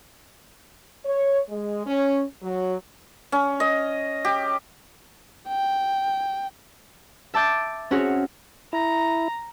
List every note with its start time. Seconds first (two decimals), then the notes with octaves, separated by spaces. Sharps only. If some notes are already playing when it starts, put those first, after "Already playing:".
1.05 C#5
1.49 G#3
1.87 C#4
2.43 F#3
3.32 C#4
3.60 D#5
4.25 G4
5.48 G5
7.34 E5 A5 D6 G6 A6
7.91 C4 C#4 F#4 G#4 C#5
8.73 E4 A#5